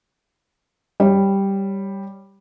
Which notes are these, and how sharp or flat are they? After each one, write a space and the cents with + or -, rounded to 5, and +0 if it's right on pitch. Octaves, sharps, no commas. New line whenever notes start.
G3 +0 C#5 +0